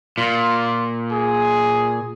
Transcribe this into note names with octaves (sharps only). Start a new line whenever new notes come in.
A#2 F4
G#4